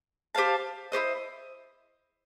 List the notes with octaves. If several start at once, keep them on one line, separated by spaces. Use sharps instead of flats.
G4 C5 F5 A5
E4 G4 C5 D#5